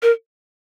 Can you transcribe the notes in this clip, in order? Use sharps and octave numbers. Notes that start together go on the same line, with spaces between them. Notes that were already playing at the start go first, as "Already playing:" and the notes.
A#4